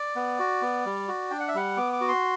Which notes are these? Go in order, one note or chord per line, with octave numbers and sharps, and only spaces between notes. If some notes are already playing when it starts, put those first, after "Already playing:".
Already playing: D5
B3
F#4
B3
G3
F#4
D4 G5
F#5
E5
G3 F#5
B3 D6
D6
F#4
C6